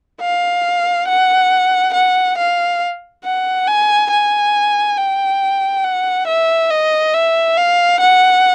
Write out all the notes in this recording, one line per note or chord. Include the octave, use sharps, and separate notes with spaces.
F5
F#5
F#5
F5
F#5
G#5
G#5
G5
F#5
E5
D#5
E5
F5
F#5